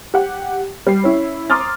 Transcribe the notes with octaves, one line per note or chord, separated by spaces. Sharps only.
G4 F#5
G3 C7
C#4 E4
A#5 C6 D6 D#6 F6 A6